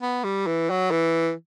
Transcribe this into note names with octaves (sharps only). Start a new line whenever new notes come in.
B3
G3
E3
F#3
E3